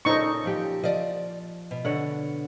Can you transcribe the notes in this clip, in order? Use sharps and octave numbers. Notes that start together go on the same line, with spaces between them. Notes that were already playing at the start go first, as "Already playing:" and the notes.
A#2 C#3 D#4 A4 C5 C#6
F3 G4 G5
F3 D5 D#5
B2
D3 C#5 F#5